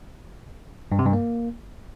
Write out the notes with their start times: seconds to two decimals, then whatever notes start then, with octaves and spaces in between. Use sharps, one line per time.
0.92 G2
0.99 C3
1.06 G2
1.13 A#3